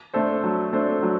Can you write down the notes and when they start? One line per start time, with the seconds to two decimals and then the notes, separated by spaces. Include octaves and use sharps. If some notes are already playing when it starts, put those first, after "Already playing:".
0.13 A3 D4 A4 C5
0.44 F#3
0.73 A3 D4 A4 C5
1.03 F#3